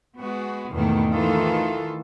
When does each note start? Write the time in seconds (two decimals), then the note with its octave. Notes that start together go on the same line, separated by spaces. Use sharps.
0.19 G#3 B3 F#4
0.71 E2 G#2 B2 D#3 A3 A#3
1.12 D#3 E3 A3 F4 A4